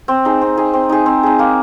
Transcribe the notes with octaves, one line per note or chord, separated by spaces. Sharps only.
C4
D#4 G#4
C4
D#4 G#4
C4
D#4 G#4
C4
D#4 G#4
A#3